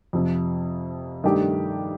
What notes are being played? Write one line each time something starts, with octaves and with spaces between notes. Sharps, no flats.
F2 C3 F3
G2 D#3 A3 D4 G4